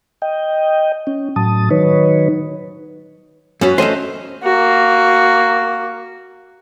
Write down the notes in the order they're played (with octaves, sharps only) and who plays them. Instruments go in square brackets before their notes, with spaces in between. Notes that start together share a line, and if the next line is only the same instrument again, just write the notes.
[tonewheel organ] D#5 G5
C#4
A2 F#3 A5 D#6
D#3 F#3 D#4 B4 C#5
[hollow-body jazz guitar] F#2 [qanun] C#4 F#4 B4
[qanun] A3 C#4 [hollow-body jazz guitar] C5 D#5 E5
[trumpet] A#3 [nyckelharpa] F#4